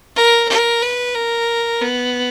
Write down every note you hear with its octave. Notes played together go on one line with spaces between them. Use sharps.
A#4
A#4
B4
A#4
B3